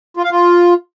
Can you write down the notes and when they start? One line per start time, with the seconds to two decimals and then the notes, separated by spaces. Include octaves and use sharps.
0.17 F4
0.24 F5
0.31 F4